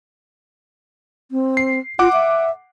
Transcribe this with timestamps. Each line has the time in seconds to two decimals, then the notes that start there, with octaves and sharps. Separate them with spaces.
1.31 C4
1.57 C7
1.99 F4 F#5 D6
2.13 E5